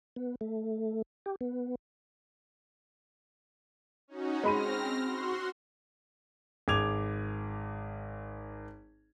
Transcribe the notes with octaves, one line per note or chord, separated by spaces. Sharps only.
B3
A3
G4
B3
C#4 D#4 F#4
G#3 C4 B5 F6 A#6 D#7
F#4 C6
G#1 G#4 D6 G#6 F7